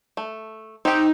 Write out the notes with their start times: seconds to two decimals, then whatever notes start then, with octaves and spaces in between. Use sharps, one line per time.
0.17 A3
0.85 C4 D#4 G4